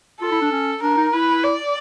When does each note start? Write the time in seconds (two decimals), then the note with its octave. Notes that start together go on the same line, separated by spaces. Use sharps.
0.21 F4 A4
0.32 E4
0.42 D4
0.52 C#4
0.82 D4 A#4
0.97 D#4
1.13 E4 B4
1.43 D5